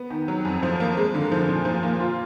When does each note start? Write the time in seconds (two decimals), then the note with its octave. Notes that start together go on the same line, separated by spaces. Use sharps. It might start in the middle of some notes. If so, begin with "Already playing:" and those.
Already playing: B3
0.10 D#3
0.28 F#3
0.45 F2
0.63 F3
0.80 A#3
0.97 G#3
1.15 D3
1.32 F3
1.49 A#2
1.65 F3
1.83 A#3
2.00 F4